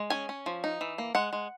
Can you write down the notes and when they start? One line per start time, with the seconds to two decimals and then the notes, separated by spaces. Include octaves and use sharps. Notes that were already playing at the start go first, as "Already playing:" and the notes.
Already playing: G#3
0.10 C#4 G#5
0.29 C#4
0.46 F3
0.64 D#4
0.81 E3
0.98 A#3
1.15 G#3 F#5
1.33 G#3